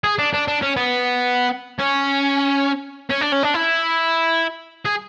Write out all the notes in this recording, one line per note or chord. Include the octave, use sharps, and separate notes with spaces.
G#4
D4
D4
D4
C#4
B3
C#4
C#4
D4
C#4
D4
E4
G#4